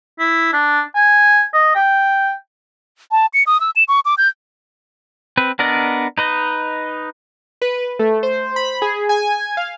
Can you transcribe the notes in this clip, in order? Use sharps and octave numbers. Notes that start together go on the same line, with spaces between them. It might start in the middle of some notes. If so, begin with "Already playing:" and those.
E4
D4
G#5
D#5
G5
A5
C#7
D#6
E6
E7
C#6
D6
G6
C4 B4
B3 D4 A#4 D5 D#5
D#4 B4 D#5
B4
A3
C5
B5
G#4
G#5
F5